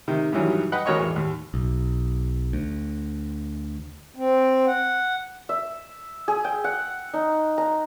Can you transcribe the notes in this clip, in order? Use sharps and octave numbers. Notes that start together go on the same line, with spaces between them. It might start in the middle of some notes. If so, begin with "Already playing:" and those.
C3 D#3
G2 D#3 E3 F#3 G3
B4 D#5 F#5 G5 B5
G#1 F#4 A#4 C#5 D#5 C#6
E2
D#2
B1
D2
C4
F#5
E5
G#4
G5
F#5
D#4
A#5